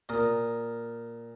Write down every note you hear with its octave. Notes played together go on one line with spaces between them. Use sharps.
A#2 A#4 D#6